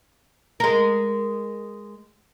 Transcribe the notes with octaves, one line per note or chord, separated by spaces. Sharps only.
G#3 A#4